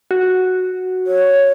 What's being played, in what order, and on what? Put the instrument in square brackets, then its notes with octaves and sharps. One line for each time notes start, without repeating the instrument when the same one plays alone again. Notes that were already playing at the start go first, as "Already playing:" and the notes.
[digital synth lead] F#4
[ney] C#5